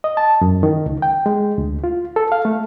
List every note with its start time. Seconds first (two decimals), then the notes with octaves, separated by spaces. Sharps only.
0.04 D#5
0.17 A5
0.41 F#2
0.63 D#3
0.86 C#2
1.02 G5
1.26 G#3
1.58 D2
1.84 F4
2.16 A4
2.32 F5
2.45 A3